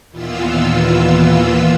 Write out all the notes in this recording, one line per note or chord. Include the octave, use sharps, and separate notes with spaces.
D#2 A#2 E3 B3 F4 E6